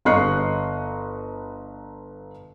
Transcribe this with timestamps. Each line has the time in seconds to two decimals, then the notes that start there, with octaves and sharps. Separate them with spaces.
0.05 G1 D#5 C#6 F#6 C7